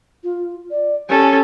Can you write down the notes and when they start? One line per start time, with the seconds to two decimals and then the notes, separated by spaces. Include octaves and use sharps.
0.24 F4
0.71 D5
1.09 C#4 G4 A4